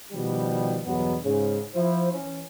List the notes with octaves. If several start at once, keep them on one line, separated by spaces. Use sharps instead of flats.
B2 D#3 F3 G3
E2 G2 B2 F#3 B3
G#2 C#3
F3 E4 C5
E3 C#4